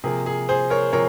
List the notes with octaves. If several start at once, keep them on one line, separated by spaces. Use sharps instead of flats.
C3 F3 A#3 G#4
G#4
G#4 C5
A#4 C#5
C3 F3 A#4 C#5